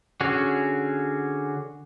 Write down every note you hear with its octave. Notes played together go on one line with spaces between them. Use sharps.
D3 C#4 F#4 G#4